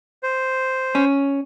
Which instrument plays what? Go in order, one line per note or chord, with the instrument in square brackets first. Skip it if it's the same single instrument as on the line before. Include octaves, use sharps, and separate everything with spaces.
[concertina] C5
[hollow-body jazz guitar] C#4